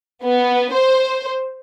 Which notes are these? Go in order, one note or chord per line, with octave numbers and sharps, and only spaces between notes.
B3
C5